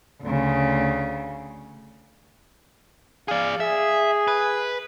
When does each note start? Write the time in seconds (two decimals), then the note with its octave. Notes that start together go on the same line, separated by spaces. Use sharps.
0.23 D2 C#3
3.28 G#4 D5 F5
3.60 G#4 E5
4.28 B4